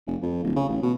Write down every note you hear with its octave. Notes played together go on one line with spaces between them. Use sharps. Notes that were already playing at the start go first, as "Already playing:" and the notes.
F1
F2
D1
C#3
A1
B2